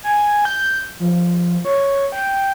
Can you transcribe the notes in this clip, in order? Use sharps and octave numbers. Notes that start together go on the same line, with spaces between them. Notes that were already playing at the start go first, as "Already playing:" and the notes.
G#5
G6
F3
C#5
G5